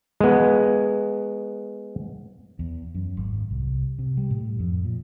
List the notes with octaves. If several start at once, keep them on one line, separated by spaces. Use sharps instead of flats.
G#3 B3
E2
F#2
G#1
C2
C3
G3
A2
F2
A#2